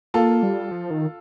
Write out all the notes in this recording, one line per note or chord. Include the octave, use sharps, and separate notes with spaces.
A#3 F4 A4
G3
F3
D#3